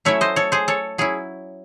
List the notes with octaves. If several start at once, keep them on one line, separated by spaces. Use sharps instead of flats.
F#3 A3 C#4 E4 C#5 E5
C5 D#5
A4 C#5
G#4 C5
A4 C#5
F#3 C#4 E4 G#4